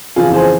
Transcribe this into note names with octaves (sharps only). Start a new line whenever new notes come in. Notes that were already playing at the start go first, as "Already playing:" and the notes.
F2 C#3 E3 F4 G#4
G#4 C5